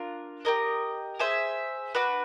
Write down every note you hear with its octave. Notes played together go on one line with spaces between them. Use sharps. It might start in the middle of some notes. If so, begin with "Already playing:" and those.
Already playing: D4 F4 A#4
G4 A#4 D#5
G#4 C5 E5 G#5
D4 F#4 B4